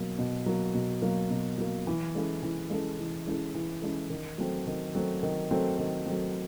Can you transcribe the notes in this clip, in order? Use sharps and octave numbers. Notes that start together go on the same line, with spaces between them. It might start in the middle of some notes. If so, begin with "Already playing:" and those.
Already playing: B2 F#3 A#3
B2
F#3 A#3
B2
F#3 A#3
B2
F#3 A#3
E3
G#3 C#4 E4 A4
E3
G#3 C#4 E4 A4
E3
G#3 C#4 E4 A4
E3
G#3 C#4 E4 A4
D#3
F#3 A3 C4
D#3
F#3 A3 C4
D#3
F#3 A3 C4
D#3
F#3 A3 C4